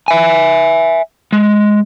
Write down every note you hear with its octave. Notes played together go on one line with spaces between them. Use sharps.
E5 G#5
G#3